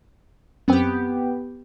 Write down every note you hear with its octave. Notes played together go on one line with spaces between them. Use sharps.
F#2 B3 C4 G4